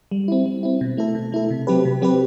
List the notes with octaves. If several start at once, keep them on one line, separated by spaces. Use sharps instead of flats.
G3
C4 E4
G3
C4 E4
B2
A3 E4 A4
B2
A3 E4 A4
C3
F#3 C4 G4 B4
C3
F#3 C4 G4 B4